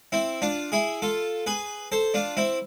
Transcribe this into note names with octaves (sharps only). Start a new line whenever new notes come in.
C4 E4
D4 F4
E4 G#4
F4 A4
G#4 B4
A4 C5
D4 F4
C4 E4